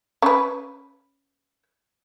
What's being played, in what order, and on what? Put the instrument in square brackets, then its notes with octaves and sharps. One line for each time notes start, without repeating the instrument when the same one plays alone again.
[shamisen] C#4 B4